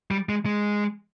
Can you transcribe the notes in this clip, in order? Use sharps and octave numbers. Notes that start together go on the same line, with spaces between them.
G3
G#3
G#3